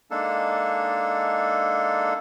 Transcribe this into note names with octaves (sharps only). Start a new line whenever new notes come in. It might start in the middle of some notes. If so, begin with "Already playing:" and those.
G#3 A#3 D4 D#4 A4